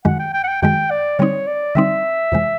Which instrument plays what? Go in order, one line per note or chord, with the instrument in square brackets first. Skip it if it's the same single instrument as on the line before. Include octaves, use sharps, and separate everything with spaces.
[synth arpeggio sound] F#2 D#3 G#3 [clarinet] F#5
[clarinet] G5
G5
F#5
G5
[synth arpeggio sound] F#2 D#3 G#3 [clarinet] G5
[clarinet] D5
[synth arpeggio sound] D3 G3 C4 D#4 [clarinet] C#5
[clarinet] D5
[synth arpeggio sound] D3 G3 C4 D#4 [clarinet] E5
[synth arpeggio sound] F2 C3 E3 G#3